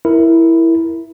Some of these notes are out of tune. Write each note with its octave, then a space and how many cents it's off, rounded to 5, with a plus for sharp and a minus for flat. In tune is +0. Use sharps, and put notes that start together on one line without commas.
E4 +0 A#4 +0